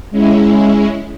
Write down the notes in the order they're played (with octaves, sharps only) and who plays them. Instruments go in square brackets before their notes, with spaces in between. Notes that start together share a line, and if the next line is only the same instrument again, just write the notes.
[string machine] G#3 C#4 E4